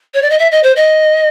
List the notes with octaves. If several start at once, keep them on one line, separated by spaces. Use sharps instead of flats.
C#5
D5
D#5
E5
D#5
C5
D#5